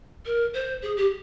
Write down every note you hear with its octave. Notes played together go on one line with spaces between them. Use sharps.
A#4
C5
G#4
G4